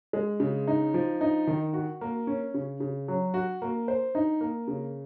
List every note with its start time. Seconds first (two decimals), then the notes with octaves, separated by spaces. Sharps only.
0.13 G#3
0.40 C#3
0.68 D#4
0.94 F3
1.21 D#4
1.47 D#3
1.73 F#4
2.01 A#3
2.27 C#4
2.54 C#3
2.80 C#3
3.08 F#3
3.34 F#4
3.62 A#3
3.88 C5
4.15 D#4
4.41 A#3
4.68 C#3